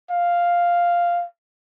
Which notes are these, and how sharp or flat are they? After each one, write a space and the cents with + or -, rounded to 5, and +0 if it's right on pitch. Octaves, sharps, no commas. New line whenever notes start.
F5 +0